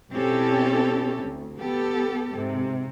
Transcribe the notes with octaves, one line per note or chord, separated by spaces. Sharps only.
B2 C4 C#4 E4 G4 A4
D2
B3 G4 A4
G#2 C3